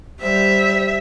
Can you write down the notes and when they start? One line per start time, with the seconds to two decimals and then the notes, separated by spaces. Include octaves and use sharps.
0.22 G3 C5 E5